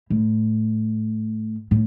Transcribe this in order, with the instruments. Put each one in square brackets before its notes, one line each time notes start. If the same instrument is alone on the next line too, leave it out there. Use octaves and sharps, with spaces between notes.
[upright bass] A2
A2